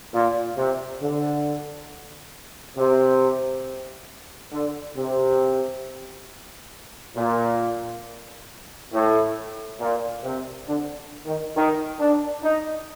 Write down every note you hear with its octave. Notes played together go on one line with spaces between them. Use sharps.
A#2
C3
D3
C3
D3
C3
A#2
A2
A#2
C3
D3
D#3
D#3
D4
D#4